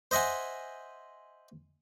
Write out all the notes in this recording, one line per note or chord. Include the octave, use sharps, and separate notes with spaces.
C5 D#5 E5 F#5 G#5